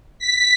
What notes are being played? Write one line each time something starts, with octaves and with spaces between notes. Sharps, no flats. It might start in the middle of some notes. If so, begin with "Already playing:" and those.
B6